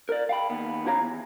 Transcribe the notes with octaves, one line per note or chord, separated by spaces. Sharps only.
A#4 D5
F5 G5 B5
D#2 B3
C#4 E4 G4 C#5 F5 A#5
E2